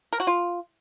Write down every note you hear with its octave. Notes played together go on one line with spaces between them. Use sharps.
A#4
F#4
F4